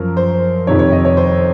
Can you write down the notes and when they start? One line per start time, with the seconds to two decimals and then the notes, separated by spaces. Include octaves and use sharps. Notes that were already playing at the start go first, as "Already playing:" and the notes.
Already playing: F#2 F3 A#4
0.17 C5
0.67 F2 C3 D#3 C#5
0.79 C#5
0.92 D#5
1.05 C#5
1.17 C5